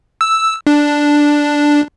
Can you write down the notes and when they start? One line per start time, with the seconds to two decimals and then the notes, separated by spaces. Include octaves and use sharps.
0.21 E6
0.67 D4